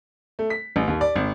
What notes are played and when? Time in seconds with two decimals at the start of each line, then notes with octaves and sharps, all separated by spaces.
0.39 A3
0.50 B6
0.76 A1
0.87 D#2
1.01 D5
1.16 G#1